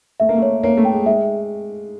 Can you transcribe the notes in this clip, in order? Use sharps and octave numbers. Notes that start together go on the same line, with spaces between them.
A3 E5
A#3
A3 C#5
A#3 C#5
A3
G5
G#3
G#3 E5